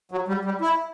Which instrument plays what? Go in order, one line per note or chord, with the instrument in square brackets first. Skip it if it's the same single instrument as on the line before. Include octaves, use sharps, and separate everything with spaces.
[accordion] F#3
G3
G3
E4